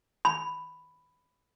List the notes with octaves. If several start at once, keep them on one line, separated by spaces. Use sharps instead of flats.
B5